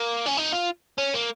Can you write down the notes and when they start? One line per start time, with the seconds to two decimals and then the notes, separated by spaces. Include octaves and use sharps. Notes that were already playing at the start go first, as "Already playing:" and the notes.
Already playing: A#3
0.26 C#4
0.37 D#4
0.53 F4
0.98 C#4
1.14 A#3